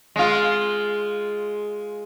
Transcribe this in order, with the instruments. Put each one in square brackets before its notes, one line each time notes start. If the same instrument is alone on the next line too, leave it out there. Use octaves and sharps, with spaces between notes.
[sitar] G#3 F4